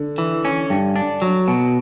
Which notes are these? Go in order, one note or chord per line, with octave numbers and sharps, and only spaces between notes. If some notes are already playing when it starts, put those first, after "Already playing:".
Already playing: D3
E3
C#4
G2
D4
F#3
B2